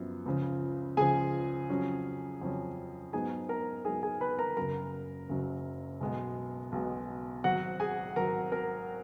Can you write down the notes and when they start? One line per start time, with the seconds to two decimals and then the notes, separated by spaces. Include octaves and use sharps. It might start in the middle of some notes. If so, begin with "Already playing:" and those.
Already playing: F#2 F3 B3
0.26 C#2 C#3 F3
0.97 C#2 C#3 F3 G#4 G#5
1.69 F2 C#3 F#3 C#4
2.41 F2 C#3 F#3 C#4
3.13 G#2 F#3 B3 D#4 G#4 G#5
3.49 A#4 A#5
3.85 G#2 F#3 B3 D#4 G#4 G#5
4.03 G#4 G#5
4.21 B4 B5
4.39 A#4 A#5
4.57 F#1 F#2 C#3 F#3 A#4 A#5
5.29 F#1 F#2 C#3 F#3
6.01 B1 B2 G#3 B3
6.72 B1 B2 G#3 B3
7.44 G#1 G#2 F#3 F#4 F#5
7.80 G#4 G#5
8.16 G#1 G#2 F#3 A#4 A#5
8.52 A#4 A#5